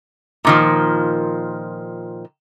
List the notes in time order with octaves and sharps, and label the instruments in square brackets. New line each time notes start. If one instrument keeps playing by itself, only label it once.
[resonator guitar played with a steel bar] A#2 D#3 F3